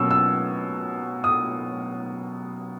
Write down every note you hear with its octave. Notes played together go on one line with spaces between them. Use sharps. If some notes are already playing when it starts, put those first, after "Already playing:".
Already playing: B2 F#3 A#3 C#4 E6
E6
D#6